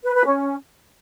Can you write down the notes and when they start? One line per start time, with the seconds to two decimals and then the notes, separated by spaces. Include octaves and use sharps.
0.04 B4
0.15 B4
0.25 C#4